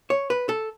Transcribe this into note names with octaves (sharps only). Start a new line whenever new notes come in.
C#5
B4
A4